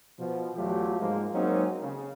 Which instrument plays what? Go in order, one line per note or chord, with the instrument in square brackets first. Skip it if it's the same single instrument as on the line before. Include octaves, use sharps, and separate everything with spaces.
[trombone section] B2 F3
E2 F#3 A3 F4 G4 A4
G#2 F3 G#3 A#3
F#3 G#3 A#3 C4 C#4 D#4
C#3